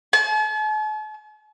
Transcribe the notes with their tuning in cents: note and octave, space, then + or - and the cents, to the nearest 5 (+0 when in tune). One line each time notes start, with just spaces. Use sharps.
A5 -45